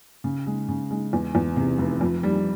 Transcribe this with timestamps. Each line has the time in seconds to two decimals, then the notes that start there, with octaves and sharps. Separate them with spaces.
0.24 C#3
0.46 G#3
0.69 C#3
0.91 G#3
1.13 E2
1.35 E2
1.56 C3
1.78 F1
2.01 F2
2.23 G3